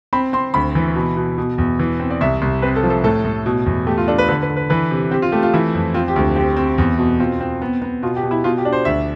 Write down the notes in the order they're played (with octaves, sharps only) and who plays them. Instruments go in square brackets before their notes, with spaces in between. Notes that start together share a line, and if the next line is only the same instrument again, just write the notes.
[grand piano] C4 B5
C4 C6
D2 B5
E3
B2
B2
B2
E2
E3
C4
D5
C2 E5
C2
C4 B4
A4
F3
A4
A2 A4
A2
B2
E2
A3 G4
F4
D4 A4
B4
D3 B4
B4
D3
B4
E3 B4
C3
C4 G4
F4
A3 G4
F4
E3 E4
F2
C4 F4
G4
D2
C4 G4
C4
E2
B2
C4 F4
C4
B3
B3
B2 F4
G4
B2
E4
B2 F4
G4
D4
C5
D2 E5